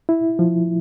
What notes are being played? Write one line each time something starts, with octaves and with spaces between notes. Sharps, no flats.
E4
F3